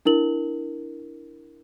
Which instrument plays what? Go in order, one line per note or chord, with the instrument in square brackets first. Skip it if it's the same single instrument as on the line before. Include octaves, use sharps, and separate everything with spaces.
[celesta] D4 E4 A#4 F#7